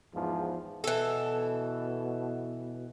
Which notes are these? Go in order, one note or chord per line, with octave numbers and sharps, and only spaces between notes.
E2 G#2 F3
B2 E3 A4